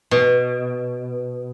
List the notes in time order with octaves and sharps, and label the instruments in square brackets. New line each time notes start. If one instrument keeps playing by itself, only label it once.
[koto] B2